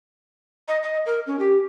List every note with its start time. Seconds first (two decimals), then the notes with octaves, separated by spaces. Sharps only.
0.68 D#5
0.83 D#5
1.06 A#4
1.27 C#4
1.39 G4